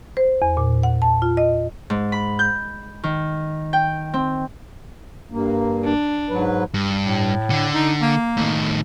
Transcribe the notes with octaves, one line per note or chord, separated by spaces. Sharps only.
C5
E2
A#2
F#5
A5
F4
D#5
G#2
B5
G6
D#3
G5
C4
G2 A#3
D4
G#2 F#3 B4
G2
A2
D3
D#4
A#3
A2 D#3